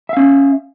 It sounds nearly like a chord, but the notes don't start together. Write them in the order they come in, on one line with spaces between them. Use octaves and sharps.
E5 F5 C#4